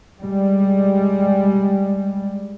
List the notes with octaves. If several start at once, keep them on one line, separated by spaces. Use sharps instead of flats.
G3 G#3